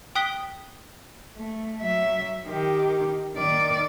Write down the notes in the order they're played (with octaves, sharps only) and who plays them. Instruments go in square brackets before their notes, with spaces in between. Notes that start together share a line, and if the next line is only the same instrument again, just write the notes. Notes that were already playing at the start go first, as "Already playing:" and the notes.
[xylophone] G5 D#6 F#6 B6 G7
[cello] A3
F#3 E5
D#3 G4
D#3 D5